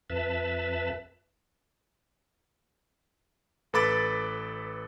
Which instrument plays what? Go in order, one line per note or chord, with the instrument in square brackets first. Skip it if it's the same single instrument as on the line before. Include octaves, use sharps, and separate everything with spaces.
[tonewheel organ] F2 B4 E5 A5
[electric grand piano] A1 A4 B4 B5 D6 A6